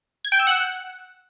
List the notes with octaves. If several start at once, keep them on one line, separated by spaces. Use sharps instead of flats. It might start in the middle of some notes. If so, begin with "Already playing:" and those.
G#6
G5
E6
F#5